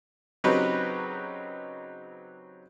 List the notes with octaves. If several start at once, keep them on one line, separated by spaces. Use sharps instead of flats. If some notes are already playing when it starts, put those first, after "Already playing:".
C#3 F#3 C4 D#4 G4 B4